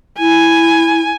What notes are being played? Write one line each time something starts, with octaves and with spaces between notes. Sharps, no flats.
E4 G#5